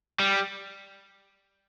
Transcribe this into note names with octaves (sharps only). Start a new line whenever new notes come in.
G3